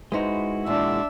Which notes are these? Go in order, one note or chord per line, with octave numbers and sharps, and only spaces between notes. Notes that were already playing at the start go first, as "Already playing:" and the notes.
G#3 D#4 E4 F#4 B4 C5
E2 A#2 D4 E5